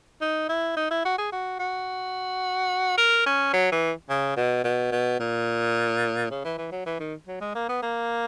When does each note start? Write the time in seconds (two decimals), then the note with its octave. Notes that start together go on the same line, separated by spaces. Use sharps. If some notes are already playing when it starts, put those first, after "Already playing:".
0.21 D#4
0.49 E4
0.77 D#4
0.91 E4
1.05 F#4
1.18 G#4
1.32 F#4
1.59 F#4
2.98 A#4
3.26 C#4
3.53 F#3
3.72 E3
4.10 C#3
4.37 B2
4.64 B2
4.91 B2
5.20 A#2
6.30 C#3
6.44 E3
6.58 E3
6.72 F#3
6.86 E3
7.00 D#3
7.27 F#3
7.41 G#3
7.55 A#3
7.69 B3
7.83 A#3